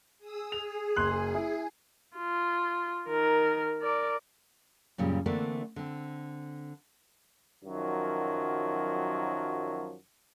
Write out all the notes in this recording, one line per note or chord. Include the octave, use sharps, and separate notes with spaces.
G#4 D#6 E6
G#4 F7
F#1 C6 F#6
E4
F4
D#3 A#4
A#4 D5
F#2 A#2 C#3 G3
D3 E3 A3 A#3 C4 D4
D3 C4
F#2 D#3 F3 F#3